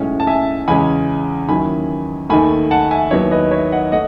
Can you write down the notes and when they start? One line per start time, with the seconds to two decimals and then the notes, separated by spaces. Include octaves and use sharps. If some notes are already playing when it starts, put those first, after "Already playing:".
Already playing: B1 A2 G#3 C#4
0.20 A5
0.27 E5 G#5
0.68 E2 C#3 G#3 C#4 G#5 B5
1.49 D#2 D#3 F#3 C#4 E4 G#5 B5
2.29 D#2 D#3 A3 G#5 B5
2.71 F#5 A5
2.91 E5 G#5
3.11 D#2 D#3 F#3 B3 E4 C#5
3.31 B4 D#5
3.51 C#5 E5
3.72 D#5 F#5
3.92 A3 D#5 F#5